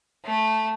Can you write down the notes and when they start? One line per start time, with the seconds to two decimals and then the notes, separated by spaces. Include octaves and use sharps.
0.25 A3